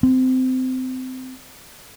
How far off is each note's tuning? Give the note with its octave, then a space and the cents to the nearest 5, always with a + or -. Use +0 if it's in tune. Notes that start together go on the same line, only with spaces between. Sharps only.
C4 -25